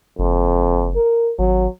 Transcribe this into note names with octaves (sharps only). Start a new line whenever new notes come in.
F#1 F2
A#4
G#1 F#3